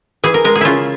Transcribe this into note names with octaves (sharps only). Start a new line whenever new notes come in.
E3 G#4
A#4
G#3 A#4
G#4
C#3 E4 F4